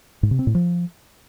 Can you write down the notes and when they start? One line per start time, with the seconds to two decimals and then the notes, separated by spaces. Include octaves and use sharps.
0.23 G#2
0.31 C3
0.39 C4
0.47 A2
0.55 F3